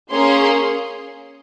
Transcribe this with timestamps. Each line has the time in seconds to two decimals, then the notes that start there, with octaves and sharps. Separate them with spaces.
0.11 A#3 C#4 G#4 C6